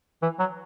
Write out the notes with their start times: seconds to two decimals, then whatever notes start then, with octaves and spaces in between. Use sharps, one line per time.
0.22 E3
0.39 F#3